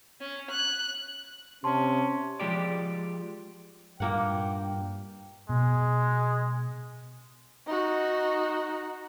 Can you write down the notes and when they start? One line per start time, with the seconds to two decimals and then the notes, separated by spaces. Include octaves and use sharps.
0.20 C#4
0.51 F#6
1.64 C3 C#4 A5 C6
2.40 F3 G#3 G4 D5
4.00 G2 A#2 A#3 F#5 G5
5.49 B2 G#3
7.67 D#4 F#4